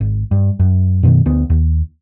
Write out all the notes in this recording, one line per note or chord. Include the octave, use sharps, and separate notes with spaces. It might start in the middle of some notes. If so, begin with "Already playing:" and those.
G#1
G2
F#2
F#2 B2 D3 D#3
D2 B3
D#2